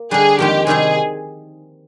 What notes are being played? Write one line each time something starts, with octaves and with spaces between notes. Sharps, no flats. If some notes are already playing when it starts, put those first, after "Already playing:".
Already playing: A#3
D3 G3 D4 G#4
F2 D#3 G#3 G4
C3 D#3 G3 C4 D#4 G#4